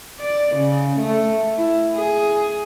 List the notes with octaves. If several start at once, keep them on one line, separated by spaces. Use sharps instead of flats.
D5
C#3
A3
E4
G#4